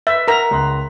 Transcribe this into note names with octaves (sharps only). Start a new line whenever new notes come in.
B4 E5
A#4 F#5 A#5 B6 F7
C#2 C6 F#6